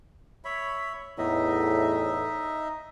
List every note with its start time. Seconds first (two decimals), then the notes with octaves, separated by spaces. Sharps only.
0.45 C#5 E5 B5
1.18 E2 A2 D#4 D#5 E5